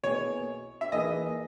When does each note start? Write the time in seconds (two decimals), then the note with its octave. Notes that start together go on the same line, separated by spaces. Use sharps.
0.03 B2 A#3 E4 G#4 B4 C#5
0.81 E5
0.92 E3 A#3 D#4 G#4 B4 D#5